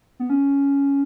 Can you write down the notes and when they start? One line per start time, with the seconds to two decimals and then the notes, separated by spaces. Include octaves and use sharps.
0.19 B3
0.30 C#4